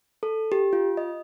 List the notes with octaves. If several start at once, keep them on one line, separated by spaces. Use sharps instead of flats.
A4
G4
F4
D#5